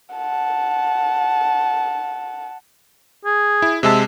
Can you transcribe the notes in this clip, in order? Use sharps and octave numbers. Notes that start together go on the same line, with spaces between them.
F#5 A5
G#4
E4
C3 G#3 E5 A5